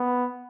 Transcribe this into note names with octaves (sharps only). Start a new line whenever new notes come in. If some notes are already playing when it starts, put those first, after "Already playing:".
Already playing: B3